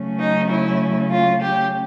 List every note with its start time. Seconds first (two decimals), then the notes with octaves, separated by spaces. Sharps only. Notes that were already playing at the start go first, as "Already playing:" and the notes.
Already playing: C#3 F#3 A3 C#4
0.19 D#4
0.50 E4
1.11 F4
1.41 G4